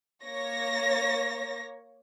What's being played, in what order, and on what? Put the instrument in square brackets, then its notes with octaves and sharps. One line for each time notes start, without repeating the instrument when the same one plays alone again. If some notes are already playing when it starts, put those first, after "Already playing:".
[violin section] A#3 C#5 A#6